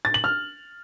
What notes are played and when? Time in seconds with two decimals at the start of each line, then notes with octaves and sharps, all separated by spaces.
0.05 A6
0.14 F#7
0.24 F6